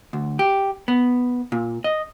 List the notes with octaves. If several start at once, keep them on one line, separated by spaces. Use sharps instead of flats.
D2
G4
B3
A#2
D#5